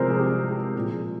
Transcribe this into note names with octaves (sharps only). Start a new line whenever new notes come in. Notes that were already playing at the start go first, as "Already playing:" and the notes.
Already playing: C3 F3 G#3 A#4 C5
G#4
G4
G#4
G4
A#2 F3 G#3
G#4